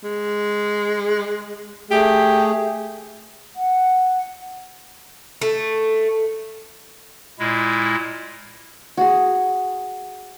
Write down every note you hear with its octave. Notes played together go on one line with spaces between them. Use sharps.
G#3
A3 G4 G#4
F#5
A3
A#2 G#3 E4
F#4 G#4